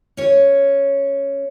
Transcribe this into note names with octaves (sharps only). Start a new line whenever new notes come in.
C#4 C#5